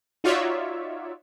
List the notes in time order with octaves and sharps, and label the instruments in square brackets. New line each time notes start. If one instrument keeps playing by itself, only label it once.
[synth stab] D#4 F4 F#4 C#5 D5 E5